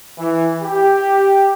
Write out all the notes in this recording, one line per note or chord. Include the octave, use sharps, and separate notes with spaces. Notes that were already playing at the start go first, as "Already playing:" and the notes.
E3
G4